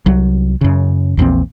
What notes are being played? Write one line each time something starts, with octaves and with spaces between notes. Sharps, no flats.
C2 F#3
F#2 C#3
A#1 E2 A#2 C4